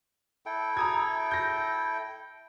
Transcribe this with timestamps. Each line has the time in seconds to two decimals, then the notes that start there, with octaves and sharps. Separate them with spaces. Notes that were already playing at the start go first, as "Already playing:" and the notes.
0.46 E4 A4 G5
0.77 A#5 D#6 G#6
1.31 G6 A#6